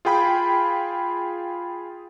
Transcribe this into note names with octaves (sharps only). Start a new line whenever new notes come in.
F4 G#4 G5 B5